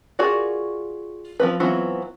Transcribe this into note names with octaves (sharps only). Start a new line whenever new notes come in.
F4 F#4 G#4 A#4 D5
F3 C4 B4
E3 F#3 B3 C4 F4